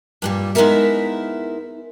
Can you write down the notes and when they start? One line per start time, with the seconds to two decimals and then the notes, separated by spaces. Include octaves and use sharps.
0.22 G2 A#2 G3
0.55 G#3 B3 D#4 E4 A#4 E5